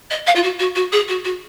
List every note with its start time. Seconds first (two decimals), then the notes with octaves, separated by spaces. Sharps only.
0.10 D#5
0.26 F5
0.35 F4
0.43 F#4
0.59 F#4
0.75 F#4
0.92 G#4
1.08 F#4
1.24 F#4